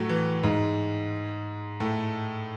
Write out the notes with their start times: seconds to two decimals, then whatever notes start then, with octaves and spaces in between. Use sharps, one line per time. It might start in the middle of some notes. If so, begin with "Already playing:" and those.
Already playing: A2 F#3 A3
0.09 E3
0.43 G#2 G#3
1.80 A2 A3